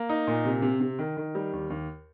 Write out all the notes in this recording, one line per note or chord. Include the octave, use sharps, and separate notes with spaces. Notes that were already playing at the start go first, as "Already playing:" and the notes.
Already playing: A#3
D#4
A#2
C3
C3
C3
D#3
D#3
G3
D#2
D#2